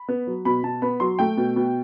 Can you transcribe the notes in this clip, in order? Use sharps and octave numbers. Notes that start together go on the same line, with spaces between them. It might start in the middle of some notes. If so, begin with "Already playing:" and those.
Already playing: B5
B3
F#3
B2 B5
B2 A5
B3 B5
F#3 C6
A3 G5
B2
B2